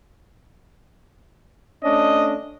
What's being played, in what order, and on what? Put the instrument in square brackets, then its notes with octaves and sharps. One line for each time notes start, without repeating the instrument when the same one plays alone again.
[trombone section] A3 C#4 D4 [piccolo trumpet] D#5